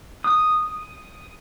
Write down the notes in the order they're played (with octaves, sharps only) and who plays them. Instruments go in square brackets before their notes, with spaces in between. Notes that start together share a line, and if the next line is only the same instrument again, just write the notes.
[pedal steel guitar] D#6